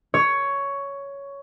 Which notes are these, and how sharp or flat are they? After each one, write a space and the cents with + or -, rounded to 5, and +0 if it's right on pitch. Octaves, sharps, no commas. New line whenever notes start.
C#5 +10